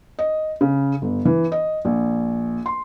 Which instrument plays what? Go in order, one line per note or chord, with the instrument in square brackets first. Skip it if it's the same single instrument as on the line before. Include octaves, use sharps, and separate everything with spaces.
[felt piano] D#5
C#3
G1
E3
D#5
A#1
C6